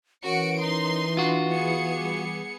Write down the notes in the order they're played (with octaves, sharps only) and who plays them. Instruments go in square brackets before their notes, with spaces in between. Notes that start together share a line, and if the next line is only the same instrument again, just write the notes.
[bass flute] E3 [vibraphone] C#4 A#4 C#5 [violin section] F#4 C#7 D7
[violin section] D#4 C6
[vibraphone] D4 D6 [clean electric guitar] F4 F#4
[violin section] B3 G#4 C#7 [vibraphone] F5
[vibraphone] G3 D6